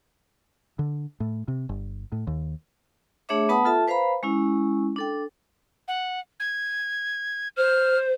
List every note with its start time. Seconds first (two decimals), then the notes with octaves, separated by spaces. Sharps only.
0.79 D3
1.20 A2
1.48 C3
1.69 G1
2.12 A2
2.27 D#2
3.29 A3 D4 G#4 C#5 E5 D6
3.49 B3 B4 F#5 A5 B5 D#6
3.65 F4 A4 E5 A5
3.88 B4 C5 F5 A#5 B5
4.23 G#3 C#4 E4
4.96 D4 A4 G5
5.88 F#5
6.40 G#6
7.57 C5 F6